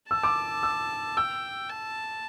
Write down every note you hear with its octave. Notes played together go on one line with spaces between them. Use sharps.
A5 E6
D6
E6
G5 E6
A5